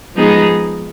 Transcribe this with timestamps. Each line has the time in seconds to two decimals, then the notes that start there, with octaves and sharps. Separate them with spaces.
0.15 F3 G#3 B3 D#4 G#4